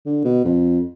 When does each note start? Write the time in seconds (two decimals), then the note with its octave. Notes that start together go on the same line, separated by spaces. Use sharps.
0.06 D3
0.24 B2
0.45 F2